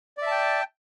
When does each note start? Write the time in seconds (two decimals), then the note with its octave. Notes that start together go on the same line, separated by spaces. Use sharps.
0.18 D5
0.22 E5
0.27 A5
0.32 G5